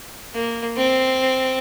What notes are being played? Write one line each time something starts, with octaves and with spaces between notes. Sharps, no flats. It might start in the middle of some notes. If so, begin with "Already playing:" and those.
A#3
C4